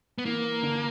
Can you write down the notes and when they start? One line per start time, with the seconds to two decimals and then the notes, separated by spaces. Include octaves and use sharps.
0.18 B3
0.25 E3 A#3
0.63 D3